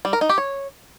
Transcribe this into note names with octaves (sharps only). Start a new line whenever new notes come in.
G3
A#4
D#4
G4
C#5